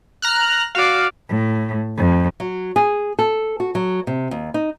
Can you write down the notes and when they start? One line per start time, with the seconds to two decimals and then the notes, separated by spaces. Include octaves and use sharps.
0.22 A#5 F6 F#6
0.75 F#4 D5 F5
1.27 A2
1.96 F2
2.40 F#3
2.76 G#4
3.19 A4
3.60 F#4
3.75 F#3
4.07 C3
4.31 D#2
4.54 D#4